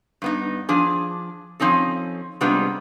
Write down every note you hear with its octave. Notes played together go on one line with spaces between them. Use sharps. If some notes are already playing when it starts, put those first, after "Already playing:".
G2 B3 D#4
F3 D4 G#4
F3 C4 C#4 D#4 A4
C3 G3 G#3 B3 D4 F4